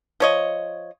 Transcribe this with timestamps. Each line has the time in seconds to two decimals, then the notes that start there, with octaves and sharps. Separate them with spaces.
0.20 F3 C#5 D#5